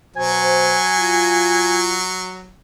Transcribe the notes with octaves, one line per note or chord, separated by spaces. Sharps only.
B2 F#3 C5 G#5
F4